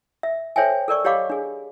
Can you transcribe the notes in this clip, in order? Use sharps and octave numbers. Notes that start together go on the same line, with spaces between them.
E5
A4 C5 C#5 E5 G5 G#5
A4 A#4 D5 C#6
G4 C#5 D#5 F5 B5 D6
D4 G#4